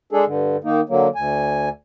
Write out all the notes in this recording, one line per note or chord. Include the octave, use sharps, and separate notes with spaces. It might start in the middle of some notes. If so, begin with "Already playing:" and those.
G#3 D4 G#4 A4
G2 D3
D#3 A#3 D#4
D3 F#3 A#3
D2 G#5